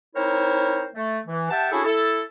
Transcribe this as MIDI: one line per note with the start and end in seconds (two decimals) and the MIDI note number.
0.15 0.87 60
0.15 0.87 63
0.15 0.87 64
0.15 0.87 70
0.15 0.87 72
0.15 0.87 73
0.94 1.19 57
1.27 1.49 52
1.50 1.70 67
1.50 1.70 76
1.50 1.70 78
1.50 1.70 79
1.50 1.70 81
1.71 1.83 61
1.71 1.83 62
1.71 1.83 64
1.71 1.83 66
1.71 1.83 68
1.71 1.83 69
1.84 2.21 64
1.84 2.21 69